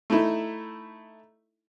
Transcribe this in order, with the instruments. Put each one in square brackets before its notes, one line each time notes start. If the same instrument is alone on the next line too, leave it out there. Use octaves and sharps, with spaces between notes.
[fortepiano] A3 D#4 E4